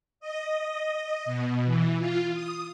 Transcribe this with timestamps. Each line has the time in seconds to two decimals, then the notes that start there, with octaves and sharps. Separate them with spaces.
0.20 D#5
0.49 D#5
0.96 D#5
1.26 B2
1.65 E3
1.98 F4
2.33 D#6